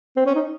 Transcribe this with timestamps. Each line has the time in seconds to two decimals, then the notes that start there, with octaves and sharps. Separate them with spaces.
0.17 C4
0.26 C#4
0.36 D#4